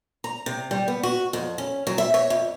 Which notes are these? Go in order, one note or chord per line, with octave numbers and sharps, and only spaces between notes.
A#5
C3
G3
B3
F#4
F2
C#4
F#3
E5
C#5
F2